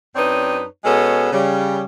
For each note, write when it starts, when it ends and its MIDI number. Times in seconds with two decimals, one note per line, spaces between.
0.16 0.64 42
0.16 0.64 60
0.16 0.64 62
0.16 0.64 63
0.16 0.64 71
0.16 0.64 73
0.85 1.32 47
0.85 1.32 56
0.85 1.32 59
0.85 1.32 61
0.85 1.32 68
0.85 1.32 69
1.33 1.85 49
1.33 1.85 55